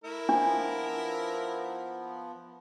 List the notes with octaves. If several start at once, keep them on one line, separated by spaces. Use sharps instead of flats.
A3 E4 A#4
F3 B3 D4